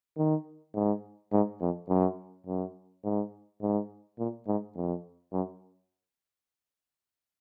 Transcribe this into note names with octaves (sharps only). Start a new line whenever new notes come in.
D#3
G#2
G#2
F2
F#2
F#2
G#2
G#2
A#2
G#2
F2
F#2